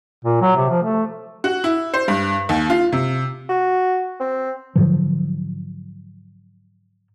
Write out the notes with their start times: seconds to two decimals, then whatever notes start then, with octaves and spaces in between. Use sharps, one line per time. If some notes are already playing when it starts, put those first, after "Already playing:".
0.25 A#2
0.41 F#3
0.56 C3
0.70 F3
0.83 A3
1.44 F#4
1.64 E4
1.94 C5
2.08 G2
2.49 D#2
2.70 F4
2.92 C3
3.49 F#4
4.20 C4
4.76 G#2 D3 F3 F#3